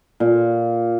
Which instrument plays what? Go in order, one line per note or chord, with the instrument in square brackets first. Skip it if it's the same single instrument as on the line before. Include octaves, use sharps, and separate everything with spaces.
[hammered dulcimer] A#2